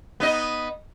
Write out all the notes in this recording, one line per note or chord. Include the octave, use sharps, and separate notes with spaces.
B3 D#4 D#5